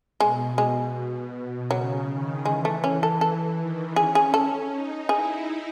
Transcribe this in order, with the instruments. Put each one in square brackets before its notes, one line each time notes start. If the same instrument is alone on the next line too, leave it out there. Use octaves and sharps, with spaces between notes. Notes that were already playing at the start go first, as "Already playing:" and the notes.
[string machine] B2 [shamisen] G#3
[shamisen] G#3
[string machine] B2
B2
[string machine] C#3 [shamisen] F#3
[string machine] D#3
[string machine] E3 [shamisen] G#3
[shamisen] A3
C#4
A4
A4
[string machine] D#3
[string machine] C#4 [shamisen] G#4
[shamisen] G#4
A4
[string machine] D#4
[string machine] E4 [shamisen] G#4